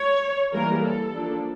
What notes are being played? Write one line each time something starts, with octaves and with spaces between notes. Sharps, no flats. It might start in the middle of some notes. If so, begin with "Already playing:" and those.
Already playing: C#5
E3 G3 A#3 A#4
A4
F3 A#3 D4